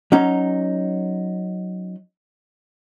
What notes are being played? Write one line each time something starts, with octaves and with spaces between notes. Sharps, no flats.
F#3 C#4 D#4